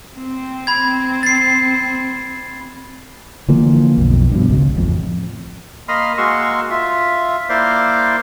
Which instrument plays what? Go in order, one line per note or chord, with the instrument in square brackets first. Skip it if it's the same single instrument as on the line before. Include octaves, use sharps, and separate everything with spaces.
[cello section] C4
[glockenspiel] B5 G#6
A6 C7
[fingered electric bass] D3 E3 F3 A#3
B1 F2
G2 B2
G#1 C#2
A1 F2
[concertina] A#3 D#5 B5 C6 F6
G#3 A#3 F#4 C6 C#6 E6
F4 E5
A#3 E4 C5 D5 C6